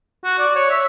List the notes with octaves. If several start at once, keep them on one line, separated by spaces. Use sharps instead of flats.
F#4
D5
C#5
E5